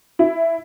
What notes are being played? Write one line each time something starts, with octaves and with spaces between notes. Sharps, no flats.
E4